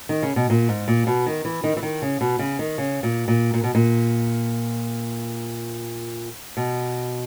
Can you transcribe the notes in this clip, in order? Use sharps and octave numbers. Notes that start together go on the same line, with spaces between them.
D#3
C#3
B2
A#2
G#2
A#2
B2
D#3
E3
D#3
E3
D#3
C#3
B2
C#3
D#3
C#3
A#2
A#2
A#2
B2
A#2
B2